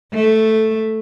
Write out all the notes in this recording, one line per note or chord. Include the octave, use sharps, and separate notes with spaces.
A3